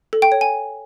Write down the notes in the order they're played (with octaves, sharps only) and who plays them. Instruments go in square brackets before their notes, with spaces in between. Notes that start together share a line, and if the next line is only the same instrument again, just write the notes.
[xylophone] A4
G5
C#5
G#5